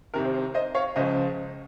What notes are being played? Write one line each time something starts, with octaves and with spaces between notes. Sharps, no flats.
C2 C3 D#3 A#4
C5
C5
C5 D#5
C#5 F5
C#2 C#3 F3 C5 D#5